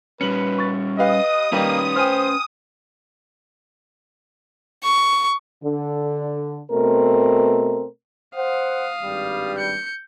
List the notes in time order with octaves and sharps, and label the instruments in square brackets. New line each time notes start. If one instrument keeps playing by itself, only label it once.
[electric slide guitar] G3 C#4 [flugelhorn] B4 [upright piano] C#7 F#7
[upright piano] C#6 A6
[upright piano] G4 B4 F5 [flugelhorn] D#5 [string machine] D#6
[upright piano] D#3 G3 D#4 [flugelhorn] A#3 [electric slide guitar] C#4 B4
[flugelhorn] C5 [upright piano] G5 G#5 F6
[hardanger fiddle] C#6
[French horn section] D3
B2 A3 C4 A#4
[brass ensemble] C5 F#5 [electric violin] F5 D#6
[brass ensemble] G#1 G2 G3
[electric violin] G6 C#7